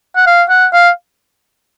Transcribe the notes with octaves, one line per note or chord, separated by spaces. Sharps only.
F#5
F5
F#5
F5